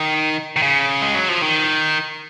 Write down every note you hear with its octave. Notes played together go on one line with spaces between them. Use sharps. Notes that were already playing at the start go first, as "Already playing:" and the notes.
Already playing: D#3
D#3
C#3
G#3
F#3
F3
D#3